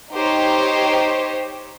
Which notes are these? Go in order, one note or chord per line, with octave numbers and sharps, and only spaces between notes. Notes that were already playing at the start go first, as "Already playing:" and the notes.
D#4 G4 C5 C#5